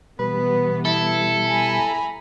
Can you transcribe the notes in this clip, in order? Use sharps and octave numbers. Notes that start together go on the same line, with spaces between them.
B2 E3 G3 B3 B4
E4 A4
G#5 A#5 B5